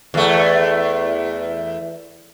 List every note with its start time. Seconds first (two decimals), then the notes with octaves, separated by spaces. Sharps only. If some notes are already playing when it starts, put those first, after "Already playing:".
0.14 E2 A3